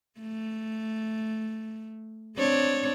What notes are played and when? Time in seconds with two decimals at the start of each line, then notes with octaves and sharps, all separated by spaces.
0.20 A3
2.36 C4 D4 C#5